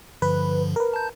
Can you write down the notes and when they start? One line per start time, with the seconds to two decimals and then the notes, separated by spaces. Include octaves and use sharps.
0.22 G2 D3 F3 B4
0.76 A#4 B4
0.94 A5 G6